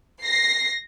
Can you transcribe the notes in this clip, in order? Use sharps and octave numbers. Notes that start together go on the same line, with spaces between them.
A#6 C7